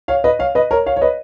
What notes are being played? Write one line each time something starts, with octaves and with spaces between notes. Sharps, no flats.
C#5 F5
B4 D#5
C#5 F5
B4 D#5
A#4 C#5
C#5 F5
C#5
B4 D#5